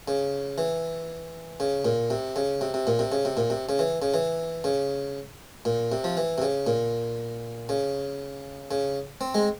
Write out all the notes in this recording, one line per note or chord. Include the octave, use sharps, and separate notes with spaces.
C#3
E3
C#3
A#2
C3
C#3
C3
C3
A#2
C3
C#3
C3
A#2
C3
C#3
E3
C#3
E3
C#3
A#2
C3
F3
E3
C3
C#3
A#2
C#3
C#3
C4
G#3